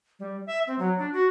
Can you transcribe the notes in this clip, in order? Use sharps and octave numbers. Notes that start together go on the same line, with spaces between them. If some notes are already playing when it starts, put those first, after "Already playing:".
G3
E5
C4
F#3
D4
F#4